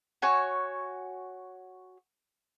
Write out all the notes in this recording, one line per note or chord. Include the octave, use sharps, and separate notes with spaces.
F#4 C#5 G#5 C#6